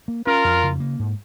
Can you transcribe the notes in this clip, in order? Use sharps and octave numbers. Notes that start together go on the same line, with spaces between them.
A#3
C#4 F4 A#4
F2
C#3
A#3
G#2